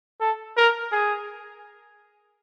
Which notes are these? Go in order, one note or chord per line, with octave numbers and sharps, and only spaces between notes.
A4
A#4
G#4